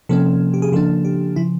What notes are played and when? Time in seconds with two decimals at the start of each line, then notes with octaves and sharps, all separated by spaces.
0.09 C3 F3 A#3 C#4 A4
0.54 G4
0.62 G#4
0.72 C#3 F3 A#3 D4 A4
1.05 G4
1.36 C#3 F3 E4